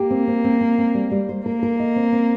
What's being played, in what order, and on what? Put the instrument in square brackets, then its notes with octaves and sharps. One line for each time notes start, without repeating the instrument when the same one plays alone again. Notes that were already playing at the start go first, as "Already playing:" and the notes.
Already playing: [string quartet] A#3 [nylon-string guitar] G4
[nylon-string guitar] C4
C4
C4
C4
C4
G3
G3
C5
[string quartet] A#3 [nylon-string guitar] A#4
[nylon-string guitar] A#4
D#5
C4
C4